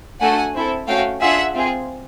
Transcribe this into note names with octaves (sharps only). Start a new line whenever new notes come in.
A3 D4 F#4 A4 F#5 G#5
C4 E4 A4
A3 C#4 F#4 F5 G5
D4 F4 G#4 E5 F#5
C4 F4 G#4